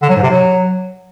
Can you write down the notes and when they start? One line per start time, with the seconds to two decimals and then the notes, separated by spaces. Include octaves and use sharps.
0.02 D3
0.09 F#3
0.16 G#2
0.23 C3
0.30 F#3